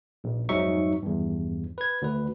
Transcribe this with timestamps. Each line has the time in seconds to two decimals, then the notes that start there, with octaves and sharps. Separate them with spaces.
0.24 A#1
0.49 F2 G#2 F#3 D#4 E5 C#6
1.03 E2 G2
1.78 B4 G#6
2.02 D2 B4